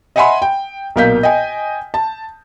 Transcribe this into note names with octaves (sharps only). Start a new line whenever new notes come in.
D#5 E5 F#5 G#5 B5 C6
G5
B1 A#2 A#4 F5 G6 B6
D#5 G5 G#5
A5